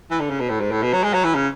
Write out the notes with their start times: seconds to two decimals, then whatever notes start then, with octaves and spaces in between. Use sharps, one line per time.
0.11 E3
0.20 D3
0.30 C#3
0.40 B2
0.49 A2
0.60 G#2
0.71 A2
0.82 B2
0.93 F#3
1.03 G#3
1.14 F#3
1.24 E3
1.35 C#3